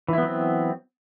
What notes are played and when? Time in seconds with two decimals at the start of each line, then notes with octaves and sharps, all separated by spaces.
0.08 E3
0.13 E4
0.18 B3
0.22 F#3
0.27 C4